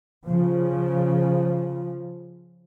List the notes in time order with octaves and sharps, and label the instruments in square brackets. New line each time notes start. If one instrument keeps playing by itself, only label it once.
[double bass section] C#3 F3